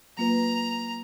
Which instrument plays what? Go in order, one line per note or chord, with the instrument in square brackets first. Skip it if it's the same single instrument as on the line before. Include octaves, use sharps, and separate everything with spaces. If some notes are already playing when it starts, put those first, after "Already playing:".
[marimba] F#3 A#3 F4 B4 [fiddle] A#5